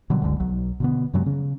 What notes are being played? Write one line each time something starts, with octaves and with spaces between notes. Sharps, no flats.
B2 D3 F#3 G3
F#1 C#2 D3 G#3
B1 F#3
B2 D3 B3
F#2 C3 F#3 G#3
C#3